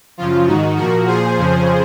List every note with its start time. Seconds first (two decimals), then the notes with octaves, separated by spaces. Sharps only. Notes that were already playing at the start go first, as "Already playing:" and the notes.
0.17 F#2 C#3 F3 F4
0.47 G#2 D#3 D#4 F#4
0.77 A#2 F3 F#4 A#4
1.07 A#2 F3 G#4 C5
1.38 F2 C#3 F3